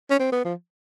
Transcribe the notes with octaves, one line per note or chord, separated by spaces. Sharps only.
C#4
C4
B3
F3